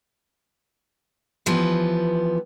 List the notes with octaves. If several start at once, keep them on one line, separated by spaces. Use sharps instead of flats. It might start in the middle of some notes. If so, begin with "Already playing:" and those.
E3 F3 B3 G4